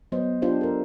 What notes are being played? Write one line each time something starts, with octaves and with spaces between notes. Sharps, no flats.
F#3 B3 C5 D#5
D4 F4 G4 C5 F5
A4 A#4